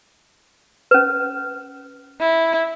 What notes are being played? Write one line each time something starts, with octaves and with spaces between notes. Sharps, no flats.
C#4 B4
E4